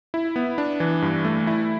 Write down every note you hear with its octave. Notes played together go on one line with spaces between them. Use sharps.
E4
B3
D4
E3
G2
A3
E4